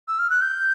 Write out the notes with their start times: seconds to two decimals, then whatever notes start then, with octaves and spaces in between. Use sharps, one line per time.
0.08 E6
0.19 F6
0.30 F#6
0.42 G6